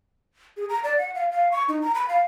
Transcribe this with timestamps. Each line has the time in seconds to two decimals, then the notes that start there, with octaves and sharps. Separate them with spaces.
0.57 G#4
0.69 A#5
0.84 D5
0.98 F#5
1.15 F5
1.31 F5
1.52 C#6
1.68 D#4
1.82 A#5
1.95 B5
2.09 F5